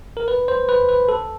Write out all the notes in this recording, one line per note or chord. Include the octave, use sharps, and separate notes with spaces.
A#4
B4
C5
B4
B4
A4